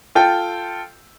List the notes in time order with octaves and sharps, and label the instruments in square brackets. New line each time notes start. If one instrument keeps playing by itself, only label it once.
[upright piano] F4 A4 G5